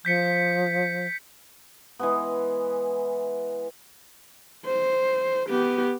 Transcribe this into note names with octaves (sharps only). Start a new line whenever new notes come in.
F3 G6 B6 C#7
E3 G#3 B3
C5
B3 G4